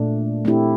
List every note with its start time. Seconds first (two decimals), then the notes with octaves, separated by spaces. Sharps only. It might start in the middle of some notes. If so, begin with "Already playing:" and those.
Already playing: A#2 A3 D4
0.45 A3 C4 E4 G4